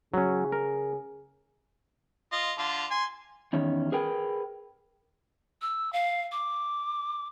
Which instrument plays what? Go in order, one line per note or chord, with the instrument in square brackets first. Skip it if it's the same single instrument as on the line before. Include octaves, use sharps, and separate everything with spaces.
[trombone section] C#3 G#4 [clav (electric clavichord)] F#3 C#4
[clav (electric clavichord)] A#4
[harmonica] F4 D#5
D3 F4
G#5 C6
[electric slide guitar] E2 D#3 C#4
G#4 A#4 B4 G5
[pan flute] E6
F5
D6